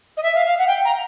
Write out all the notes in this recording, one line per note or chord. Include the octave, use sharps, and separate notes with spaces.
D#5
E5
F5
F5
F#5
G5
A#5